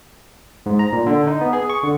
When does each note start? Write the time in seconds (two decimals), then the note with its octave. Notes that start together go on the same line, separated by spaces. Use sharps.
0.66 G#2
0.79 A#5
0.93 A#2
1.06 D3
1.27 D#4
1.41 B3
1.53 G#4
1.70 C#6
1.83 D3